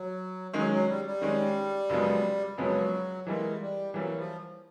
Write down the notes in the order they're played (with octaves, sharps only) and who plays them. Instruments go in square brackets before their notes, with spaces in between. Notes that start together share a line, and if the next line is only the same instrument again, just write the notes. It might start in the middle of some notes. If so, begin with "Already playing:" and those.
Already playing: [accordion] F#3
[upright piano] D#3 G#3 C#4 [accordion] F#3
[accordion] F#3
G3
G3
[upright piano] D#3 G#3 C#4
F#2 C#3 F3 G#3 B3
[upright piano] F#2 C#3 F3 G#3 B3 [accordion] F#3
[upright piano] E3 G3 A#3 [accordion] G#3
[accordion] G3
[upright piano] E3 G3 A#3 [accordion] F#3
[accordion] F3